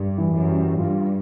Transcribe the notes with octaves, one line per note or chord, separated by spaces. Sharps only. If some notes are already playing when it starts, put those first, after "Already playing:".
Already playing: G2 G3
E3
F#2
G3
G2 F4